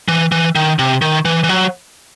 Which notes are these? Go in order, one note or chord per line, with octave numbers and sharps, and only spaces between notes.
E3
E3
D#3
C3
D#3
E3
E3
F#3